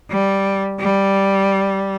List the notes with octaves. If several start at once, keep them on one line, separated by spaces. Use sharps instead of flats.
G3
G3